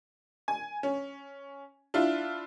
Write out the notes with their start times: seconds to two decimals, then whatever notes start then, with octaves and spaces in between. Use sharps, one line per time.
0.48 G#5
0.83 C#4
1.94 D4 E4 F4